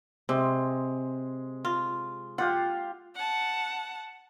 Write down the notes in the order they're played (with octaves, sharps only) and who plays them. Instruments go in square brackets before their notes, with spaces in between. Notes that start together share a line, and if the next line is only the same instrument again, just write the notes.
[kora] C3 [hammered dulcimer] G#3
[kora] F4
[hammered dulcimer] F4 G4 F5 [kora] F#5
[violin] F#5 A5